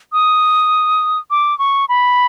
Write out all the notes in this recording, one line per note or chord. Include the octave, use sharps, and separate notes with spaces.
D#6
D6
C#6
B5